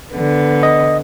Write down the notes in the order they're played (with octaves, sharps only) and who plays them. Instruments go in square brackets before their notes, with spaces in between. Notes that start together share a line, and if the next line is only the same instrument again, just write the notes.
[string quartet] D3 B3
[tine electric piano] D#5